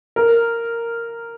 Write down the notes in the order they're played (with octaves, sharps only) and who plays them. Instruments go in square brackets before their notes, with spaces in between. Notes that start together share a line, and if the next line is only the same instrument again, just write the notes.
[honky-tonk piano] A#4